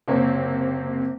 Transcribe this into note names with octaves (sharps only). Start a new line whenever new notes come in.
F#1 C3 A#3 C4 C#5